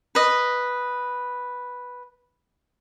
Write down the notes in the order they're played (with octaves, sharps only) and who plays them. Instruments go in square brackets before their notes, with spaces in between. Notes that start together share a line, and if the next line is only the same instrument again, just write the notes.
[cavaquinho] B4 D#5